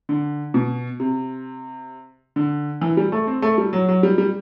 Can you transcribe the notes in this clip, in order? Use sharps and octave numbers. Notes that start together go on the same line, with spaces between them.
D3
B2
C3
D3
E3
G3
A3
C4
A3
G3
F#3
F#3
G3
G3